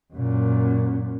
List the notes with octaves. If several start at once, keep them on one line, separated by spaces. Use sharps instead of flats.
F#2 A#2